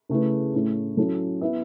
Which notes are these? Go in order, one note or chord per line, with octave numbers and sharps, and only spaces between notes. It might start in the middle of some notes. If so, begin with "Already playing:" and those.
C#3 A3 E4 B4
A2 A3 C#4 E4
F#3 C#4 E4 A4
B3 E4 B4 E5